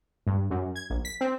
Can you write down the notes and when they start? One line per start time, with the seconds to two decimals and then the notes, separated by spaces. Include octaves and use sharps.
0.27 G2
0.50 F#2
0.76 G#6
0.90 A#1
1.05 B6
1.21 C4